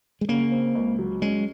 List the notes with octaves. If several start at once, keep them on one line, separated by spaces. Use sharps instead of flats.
G#3
C#3 A#3
C4
C#2
F#3
G#3 C#4